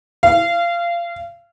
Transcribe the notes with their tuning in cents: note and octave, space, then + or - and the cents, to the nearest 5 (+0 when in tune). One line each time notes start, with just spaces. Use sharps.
F5 -25